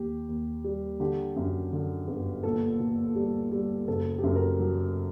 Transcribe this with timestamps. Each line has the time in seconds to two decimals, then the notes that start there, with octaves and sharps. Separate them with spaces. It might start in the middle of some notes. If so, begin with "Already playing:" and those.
Already playing: D#2 G4
0.28 D#2
0.64 G3
1.00 D3 G4
1.36 F#2
1.73 D3
2.08 G1
2.43 A#2 A4
2.80 A#2
3.15 G3
3.52 G3
3.88 F#1 A4
4.18 G4
4.23 F#2 A4
4.36 A#4
4.60 F#3